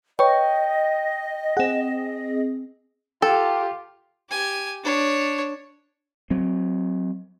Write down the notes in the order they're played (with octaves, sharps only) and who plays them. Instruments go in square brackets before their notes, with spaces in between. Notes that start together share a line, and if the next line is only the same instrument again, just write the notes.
[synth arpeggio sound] B4 C#5 C#6 [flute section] D#5 [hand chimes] G5
[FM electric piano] C4 G#4 [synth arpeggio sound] F#5 E7
[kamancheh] F4 G4 [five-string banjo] A4 [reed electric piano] G5
[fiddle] G4 G#5
D4 C#5
[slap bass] F#3 C4